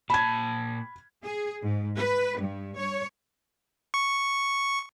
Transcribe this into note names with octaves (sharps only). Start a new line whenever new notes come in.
A#2 A5 B5 G#6
G#4
G#2
B4
G2
C#5
C#6